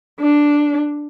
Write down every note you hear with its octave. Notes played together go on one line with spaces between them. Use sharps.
D4